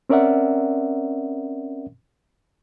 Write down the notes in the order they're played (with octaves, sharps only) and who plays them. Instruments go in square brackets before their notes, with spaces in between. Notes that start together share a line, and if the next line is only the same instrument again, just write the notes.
[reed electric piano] C4 C#4 A#4 D5 E5 F#5